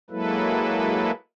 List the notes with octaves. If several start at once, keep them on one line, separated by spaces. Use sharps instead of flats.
F#3 G#3 A#3 E4 A4 B4